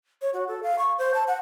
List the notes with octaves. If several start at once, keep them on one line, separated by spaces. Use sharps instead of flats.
C#5
F#4
A4
F5
C#6
C5
A5
F#5